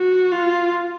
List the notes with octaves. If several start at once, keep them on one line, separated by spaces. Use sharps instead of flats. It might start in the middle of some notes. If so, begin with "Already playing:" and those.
Already playing: F#4
F4